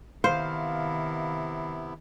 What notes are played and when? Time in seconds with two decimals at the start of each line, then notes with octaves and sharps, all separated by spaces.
0.24 C3 D#3 B3 E4 C5 F5